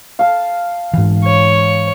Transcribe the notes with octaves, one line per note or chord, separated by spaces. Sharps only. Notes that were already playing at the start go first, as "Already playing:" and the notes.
F5 A5
G#2 E3
C#5